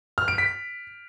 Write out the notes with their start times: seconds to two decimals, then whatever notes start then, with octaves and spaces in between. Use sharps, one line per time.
0.18 F6
0.28 D7
0.38 B6